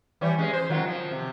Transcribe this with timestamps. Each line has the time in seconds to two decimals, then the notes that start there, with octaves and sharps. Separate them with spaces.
0.21 E3 G3 C#5
0.38 G#3 C#4
0.53 C5
0.69 D#3 F#3 F4
0.88 F3
1.11 C3